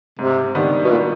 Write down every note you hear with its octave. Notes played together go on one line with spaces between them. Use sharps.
G#2 C3
D#3 G3 B3 D4
B2
A#2